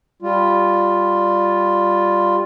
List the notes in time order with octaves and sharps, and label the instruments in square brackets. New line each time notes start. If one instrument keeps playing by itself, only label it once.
[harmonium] G3 F4